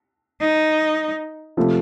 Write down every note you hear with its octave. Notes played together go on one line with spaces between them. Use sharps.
D#4
C3 F3 A3